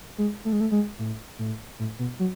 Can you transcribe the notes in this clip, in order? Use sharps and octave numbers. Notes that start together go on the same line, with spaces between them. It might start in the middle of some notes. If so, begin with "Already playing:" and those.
G#3
A3
G#3
A3
G#3
A2
A2
A2
B2
F#3